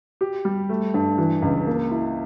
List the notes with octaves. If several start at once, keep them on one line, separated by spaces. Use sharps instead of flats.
G4
G3
A3
G2
E3
C#2
A#3
E4